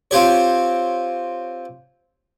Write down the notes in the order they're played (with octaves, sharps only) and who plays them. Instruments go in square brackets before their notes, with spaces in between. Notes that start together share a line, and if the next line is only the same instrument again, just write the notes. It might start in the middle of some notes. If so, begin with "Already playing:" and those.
[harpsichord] C4 F4 G4 C#5